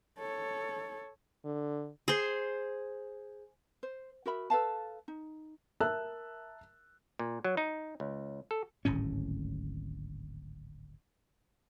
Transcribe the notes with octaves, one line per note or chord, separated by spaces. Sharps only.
A4 C#5
D3
G#4 C5
C5
F#4 A#4 E5 B5
A4 B4 F5 A5
D#4
A#4 E5 A5 E6 F#6
A#2
F#3
D#4
C#2
A4
D1 G#1 A2 C#4